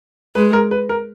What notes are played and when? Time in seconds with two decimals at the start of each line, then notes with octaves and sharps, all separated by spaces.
0.35 G#3 B4
0.53 A#4
0.71 B4
0.89 A#4